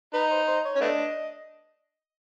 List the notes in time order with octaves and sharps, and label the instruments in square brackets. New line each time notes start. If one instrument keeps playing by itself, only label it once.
[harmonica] D#4 [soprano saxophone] B4
[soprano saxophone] C5
C5
C#5
[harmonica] C#4
[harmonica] A3 B3 D4 [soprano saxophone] D#5